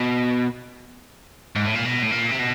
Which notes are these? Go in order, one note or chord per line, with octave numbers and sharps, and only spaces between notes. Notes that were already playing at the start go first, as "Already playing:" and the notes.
Already playing: B2
G#2
A2
A#2
B2
A2
A#2
C3
B2